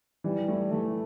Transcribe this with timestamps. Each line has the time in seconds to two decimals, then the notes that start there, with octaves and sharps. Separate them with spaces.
0.24 E3 G3
0.48 A3 E4
0.71 E3 A3